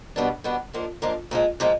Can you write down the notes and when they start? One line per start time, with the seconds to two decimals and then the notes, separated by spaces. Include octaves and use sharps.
0.16 B2 G3 B3 D4
0.44 B2 G3 B3 D4
0.73 G#2 F3 A#3 D4
1.02 G#2 F3 A#3 D4
1.31 A#2 F3 G#3
1.60 A#2 F3 G#3